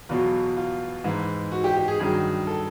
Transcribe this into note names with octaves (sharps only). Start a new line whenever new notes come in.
E2 B2 F#3 F4
F4
G#2 E3
F#4
G4
G4
G#4
G2 D#3 F#3 G#4
A4